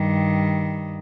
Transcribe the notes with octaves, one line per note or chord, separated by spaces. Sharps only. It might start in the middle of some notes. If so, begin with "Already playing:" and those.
Already playing: G2 D#3 G3